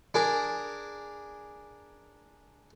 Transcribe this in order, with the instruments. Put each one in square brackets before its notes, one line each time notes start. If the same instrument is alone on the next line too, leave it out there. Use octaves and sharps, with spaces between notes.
[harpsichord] D4 G#4 A#4